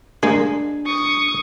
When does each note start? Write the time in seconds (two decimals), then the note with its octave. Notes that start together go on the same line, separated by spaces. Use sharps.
0.23 G#3 A#3 D4 G#4
0.86 C#6 D#6